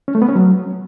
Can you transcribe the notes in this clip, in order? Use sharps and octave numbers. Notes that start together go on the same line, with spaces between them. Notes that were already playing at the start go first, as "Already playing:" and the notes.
C#4
A3
B3
C#4
F#3